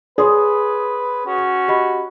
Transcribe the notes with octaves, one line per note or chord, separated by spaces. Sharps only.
G#4 B4 C#5 C6 D#6
C#4 F#4
G4 D#5 B5